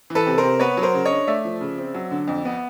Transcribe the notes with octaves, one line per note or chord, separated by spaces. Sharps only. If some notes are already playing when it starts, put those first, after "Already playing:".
E3
A4 B4
C3
A#4 C5
C3
B3 B4 C#5
F#3
A#4 C5
C#3
C#5 D#5
D4
A3 D5 E5
F3
C#3
C4
F#3
D3
F2
B3